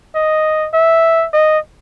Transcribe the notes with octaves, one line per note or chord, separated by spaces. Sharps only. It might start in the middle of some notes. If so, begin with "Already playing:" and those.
D#5
E5
D#5